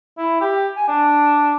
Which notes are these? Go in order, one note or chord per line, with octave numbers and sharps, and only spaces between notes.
E4
G4
G#5
D4